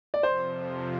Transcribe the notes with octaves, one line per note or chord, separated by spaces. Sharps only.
D5
F2 C3 F3 C5